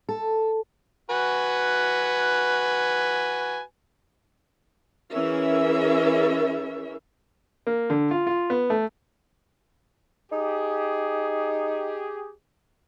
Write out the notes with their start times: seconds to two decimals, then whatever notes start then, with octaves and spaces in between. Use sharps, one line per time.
0.09 A4
1.10 F#4 B4 G#5
5.12 E3 C#4 G#4 A#4 E5
7.67 A#3
7.90 D3
8.11 F4
8.27 F4
8.50 B3
8.70 A3
10.32 D#4 G4 G#4